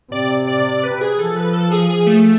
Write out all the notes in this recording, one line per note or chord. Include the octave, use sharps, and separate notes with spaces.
C3 D5
D5
D5
B4
G#4
F3 A4
B4
A4
G#4
G#4
A3